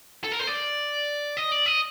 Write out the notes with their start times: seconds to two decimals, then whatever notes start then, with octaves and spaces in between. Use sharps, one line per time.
0.24 A4
0.32 A#4
0.39 C5
0.47 D5
1.37 D#5
1.52 D5
1.66 D#5